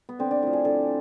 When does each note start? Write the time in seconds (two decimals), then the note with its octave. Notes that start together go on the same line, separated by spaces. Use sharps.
0.09 B3
0.19 D3 C4
0.31 D4
0.42 F3 A3 E4
0.53 G#4
0.65 D3 A4